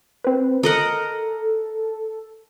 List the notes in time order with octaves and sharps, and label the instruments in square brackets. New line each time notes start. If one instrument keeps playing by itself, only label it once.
[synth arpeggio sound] C4 B4
[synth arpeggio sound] A4 [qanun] A#4 D#5 F#5